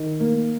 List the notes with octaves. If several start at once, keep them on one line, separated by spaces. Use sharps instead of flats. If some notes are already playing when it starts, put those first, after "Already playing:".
Already playing: D#3
A#3